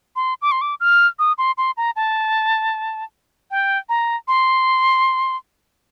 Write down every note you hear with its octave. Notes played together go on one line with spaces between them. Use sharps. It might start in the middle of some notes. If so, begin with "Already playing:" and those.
C6
D6
C6
D6
F6
D#6
C6
C6
A#5
A5
G5
A#5
C6